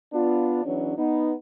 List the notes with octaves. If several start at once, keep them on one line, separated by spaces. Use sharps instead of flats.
B3 D4 F4
E2 E3 F#3 C#4 D4
B3 D#4